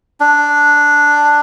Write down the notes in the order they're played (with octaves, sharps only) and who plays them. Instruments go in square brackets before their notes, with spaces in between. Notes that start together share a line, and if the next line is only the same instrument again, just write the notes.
[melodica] D4